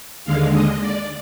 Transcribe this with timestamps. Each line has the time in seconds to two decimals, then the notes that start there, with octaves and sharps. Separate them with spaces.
0.25 D#2 D3 G#3 F5
0.54 D#5
0.81 D5